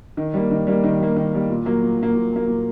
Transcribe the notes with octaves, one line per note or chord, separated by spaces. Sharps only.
D#3
G3 A#3
D#3
G3 A#3
D#3
G3 A#3
D#3
G3 A#3
A#2
F#3 A#3
A#2
F#3 A#3
A#2
F#3 A#3
A#2